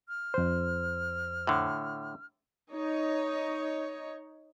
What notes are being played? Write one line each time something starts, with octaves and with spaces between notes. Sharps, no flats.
F6
F2 C5
A2 D3
D#4 C#5